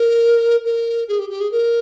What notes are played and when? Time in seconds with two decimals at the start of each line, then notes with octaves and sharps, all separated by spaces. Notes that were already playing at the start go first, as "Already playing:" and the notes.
Already playing: A#4
0.65 A#4
1.08 G#4
1.19 G4
1.30 G4
1.40 G#4
1.52 A#4